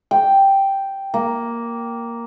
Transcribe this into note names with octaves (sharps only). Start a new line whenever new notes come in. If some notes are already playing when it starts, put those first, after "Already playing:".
G5
A#3